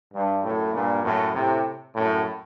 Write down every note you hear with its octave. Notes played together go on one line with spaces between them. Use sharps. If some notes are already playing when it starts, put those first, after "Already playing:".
G2
F#2 A2
G2 A#2
F#2 A2
A2 C3
F#2 A2